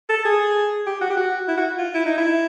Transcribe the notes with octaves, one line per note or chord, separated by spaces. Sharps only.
A4
G#4
G4
F#4
G4
F#4
E4
F#4
F4
E4
D#4
E4